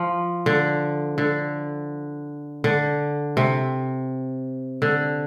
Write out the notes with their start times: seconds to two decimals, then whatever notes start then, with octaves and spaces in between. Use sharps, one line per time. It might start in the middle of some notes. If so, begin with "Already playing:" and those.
Already playing: F3
0.46 D3
1.18 D3
2.64 D3
3.37 C3
4.82 D3